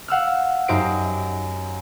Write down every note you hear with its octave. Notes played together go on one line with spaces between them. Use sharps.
F5 F#5 E6 F6
F#2 D#4 G4 C5 C7 D7